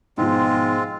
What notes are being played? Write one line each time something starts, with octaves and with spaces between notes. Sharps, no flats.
G#2 B2 F3 G#3 C4 F4